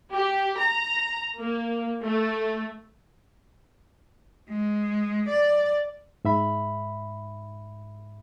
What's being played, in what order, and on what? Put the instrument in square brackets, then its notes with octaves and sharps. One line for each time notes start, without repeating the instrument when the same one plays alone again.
[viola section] G4
A#5
A#3
A3
[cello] G#3
D5
[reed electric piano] G#2 E5 B5